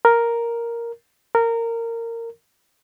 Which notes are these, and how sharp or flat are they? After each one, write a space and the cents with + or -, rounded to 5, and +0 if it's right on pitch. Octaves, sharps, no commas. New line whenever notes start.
A#4 +0
A#4 -20